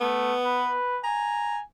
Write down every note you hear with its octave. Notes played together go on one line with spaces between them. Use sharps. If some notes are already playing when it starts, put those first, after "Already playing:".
A3 B3
B4
G#5 A#5